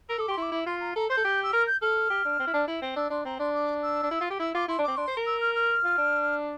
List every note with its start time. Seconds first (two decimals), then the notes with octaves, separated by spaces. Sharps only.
0.09 A#4 E6
0.18 A4 D6
0.28 G4 C6
0.37 E4 D6
0.52 E4
0.66 F4 C6
0.80 A#5
0.95 A4 A#5
1.09 C5 G6
1.17 A4
1.25 G4
1.43 E6
1.52 A#4 F6
1.67 G6
1.81 A4 F6
2.10 G4
2.25 D4
2.39 C4
2.47 E4
2.54 D4
2.68 E4
2.82 C4
2.96 D4 E6
3.10 D4 C6
3.25 C4 A#5
3.39 D4 C6
3.54 D6
3.82 E6
4.03 D4
4.11 E4
4.21 F4
4.30 G4
4.39 E4 E6
4.54 F4 D6
4.68 E4 C6
4.79 D4
4.83 C4 D6
4.97 D4 C6
5.07 C5
5.17 A#4
5.26 E6
5.40 F6
5.55 F6
5.84 F4
5.98 D4